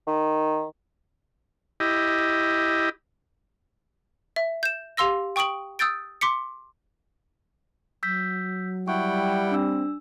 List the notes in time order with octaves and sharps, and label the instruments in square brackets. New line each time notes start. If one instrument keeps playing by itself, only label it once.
[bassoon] D#3
[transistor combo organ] E4 G4 D#5
[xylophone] E5
G6 E7
G4 F5 C6 E6 A#6
G5 C#6 D#6 D7 F#7
D#6 E6 G6 A6 D7
C6 D6 B6 C#7
[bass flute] F#3 [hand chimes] E6 G6 B6
[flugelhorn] G3 [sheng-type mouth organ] E4 F#5 G5 [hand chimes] C#6
[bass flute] C4 [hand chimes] D4 E6